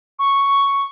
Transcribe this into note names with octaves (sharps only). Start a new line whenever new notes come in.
C#6